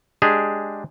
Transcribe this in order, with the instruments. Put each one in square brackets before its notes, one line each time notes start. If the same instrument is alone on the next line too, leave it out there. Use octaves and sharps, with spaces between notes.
[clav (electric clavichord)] G#3 D4 G4 G#4